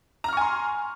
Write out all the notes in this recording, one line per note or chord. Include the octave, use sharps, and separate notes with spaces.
G#5 A#5 C6 C#6 F6